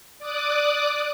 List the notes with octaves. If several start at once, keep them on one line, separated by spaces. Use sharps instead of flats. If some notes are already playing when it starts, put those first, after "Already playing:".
D5 D6 D#6 F#6